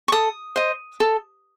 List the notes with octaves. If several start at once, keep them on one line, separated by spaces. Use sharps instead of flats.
C#6
A4 D#6
C5 D#5
A4